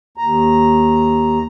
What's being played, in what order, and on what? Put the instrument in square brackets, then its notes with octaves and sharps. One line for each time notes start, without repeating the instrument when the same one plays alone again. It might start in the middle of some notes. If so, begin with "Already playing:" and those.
[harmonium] D#2 A#5